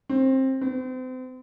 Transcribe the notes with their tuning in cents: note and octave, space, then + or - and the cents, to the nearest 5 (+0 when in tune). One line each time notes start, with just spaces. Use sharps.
C4 +20
C4 -35